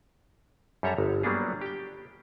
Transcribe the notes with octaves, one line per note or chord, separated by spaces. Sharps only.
F#2 G3 A4 C#5 E5 A#5
G1
F#3 G3 A#3 B3 D4 G#4
G4 G5